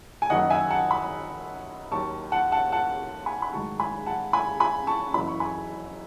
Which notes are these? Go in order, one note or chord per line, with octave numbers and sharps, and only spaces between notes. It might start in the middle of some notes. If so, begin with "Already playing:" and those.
G#5
F#1 F#2 D#3 D#5 F#5
E5 G#5
F#5 A5
G#5 B5
D#2 D#3 F#3 A5 C#6
F#5 A5
F#5 A5
F#5 A5
G#5 B5
B5
A1 G#2 D#3 F#3 A5 C#6
G#5 B5
F#5 A5
G#5 B5
G#5 B5
A5 C#6
F#1 F#2 E3 B5
C#6
G#5 B5